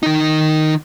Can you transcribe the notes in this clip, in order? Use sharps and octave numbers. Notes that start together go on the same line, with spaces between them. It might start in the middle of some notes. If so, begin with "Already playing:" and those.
D#3 D#4